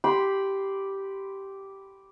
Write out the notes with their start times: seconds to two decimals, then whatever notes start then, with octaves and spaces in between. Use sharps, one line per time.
0.04 G4 B5 C6